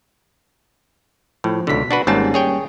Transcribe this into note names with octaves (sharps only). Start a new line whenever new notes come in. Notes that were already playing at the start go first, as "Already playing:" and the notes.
A2 F3
C#2 B2 D3 B6
D4 F#4 B4
G#1 G#2 G3 A#3 C#4 A5
G#4 C#5 G5